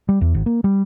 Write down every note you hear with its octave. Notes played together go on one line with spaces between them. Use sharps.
G3
E2
G#1
A#3
G3